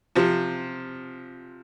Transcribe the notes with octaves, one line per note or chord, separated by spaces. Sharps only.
C3 F3